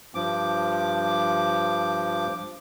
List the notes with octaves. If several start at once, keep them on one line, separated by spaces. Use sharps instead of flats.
G2 F3 D6